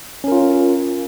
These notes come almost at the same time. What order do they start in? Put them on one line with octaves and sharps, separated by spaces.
C#4 A#4 F4